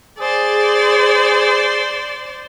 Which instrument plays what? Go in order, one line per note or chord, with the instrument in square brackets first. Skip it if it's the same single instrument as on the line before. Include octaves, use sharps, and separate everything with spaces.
[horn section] G#4 [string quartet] C5 D5